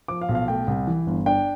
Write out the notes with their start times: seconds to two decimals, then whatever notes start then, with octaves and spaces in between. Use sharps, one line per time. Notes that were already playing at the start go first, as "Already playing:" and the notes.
0.08 F3 D6
0.21 F5
0.29 B1
0.35 F5
0.48 A3 G5
0.67 C2
0.87 E3
1.07 G1
1.26 D4 G5